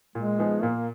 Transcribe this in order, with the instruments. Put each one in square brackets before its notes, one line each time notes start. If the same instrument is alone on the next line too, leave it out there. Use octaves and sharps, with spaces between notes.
[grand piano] A#2 [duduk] G#3
[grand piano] F3 B3 D#4 G#4
[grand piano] A#2 [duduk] A#3